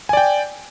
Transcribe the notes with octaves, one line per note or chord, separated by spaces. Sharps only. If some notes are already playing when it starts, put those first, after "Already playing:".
D5 G5 G#5